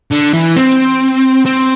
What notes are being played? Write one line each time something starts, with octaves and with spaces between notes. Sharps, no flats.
D3
E3
C4
C4